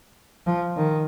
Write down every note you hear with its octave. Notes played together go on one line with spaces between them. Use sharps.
F3
D#3